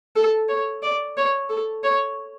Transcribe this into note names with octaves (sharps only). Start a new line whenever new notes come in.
A4
C#5
D5
C#5
A4
C#5